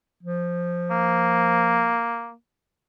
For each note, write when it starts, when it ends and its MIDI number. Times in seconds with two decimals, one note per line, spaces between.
0.23 2.03 53
0.91 2.34 58